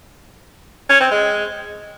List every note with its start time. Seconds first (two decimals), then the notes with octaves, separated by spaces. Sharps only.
0.89 C#4
1.00 C4
1.11 G#3